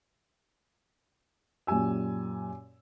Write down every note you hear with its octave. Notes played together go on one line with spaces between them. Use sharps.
F#2 A#2 G4 G#5 E6